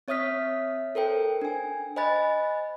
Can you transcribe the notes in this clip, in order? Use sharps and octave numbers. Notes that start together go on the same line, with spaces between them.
C4 C#5 E5 D#6 F6 B6
A4 A#4 C5 G5
D4 G#5
C5 D#5 G#5 B5 F#6 A6